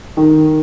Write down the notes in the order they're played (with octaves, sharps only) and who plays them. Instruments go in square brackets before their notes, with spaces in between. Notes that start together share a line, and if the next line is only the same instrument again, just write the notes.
[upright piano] D#3